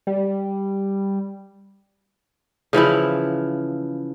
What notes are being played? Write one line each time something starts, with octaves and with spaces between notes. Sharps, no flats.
G3
C#3 E3 F3 E4